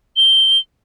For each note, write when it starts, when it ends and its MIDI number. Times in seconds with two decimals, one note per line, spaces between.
0.16 0.58 103